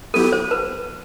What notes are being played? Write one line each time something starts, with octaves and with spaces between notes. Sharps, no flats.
F#3 B3 E4 G4 A4
C5
B4